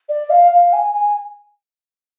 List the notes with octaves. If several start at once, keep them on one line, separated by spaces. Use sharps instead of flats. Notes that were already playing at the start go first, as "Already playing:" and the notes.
D5
F5
F5
G#5
G#5